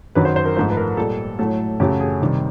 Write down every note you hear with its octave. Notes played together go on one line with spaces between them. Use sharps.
F#2 D#3 F#3 B4
C5
C5
A#4
G#2 F3 A3 C5
B4
A#4
A#2 G3 A4
A2 F#3 A3 A4
F#2 C#3 F#3 A3 G4
G#4
C3 D#3 G3